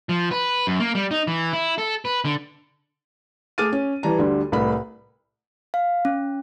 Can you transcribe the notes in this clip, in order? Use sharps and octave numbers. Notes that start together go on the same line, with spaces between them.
F3
B4
F#2
A#3
G3
D#4
E3
E4
A4
B4
D3
A3 G#4 D6 F6 A6 D#7
C#4
E3 G3 A5 A#5
D2 D3 G3
C2 A2 B4 B5
F5
C#4